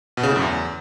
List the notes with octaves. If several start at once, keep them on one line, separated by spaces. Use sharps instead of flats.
B2
C#3
A2
F#2
E2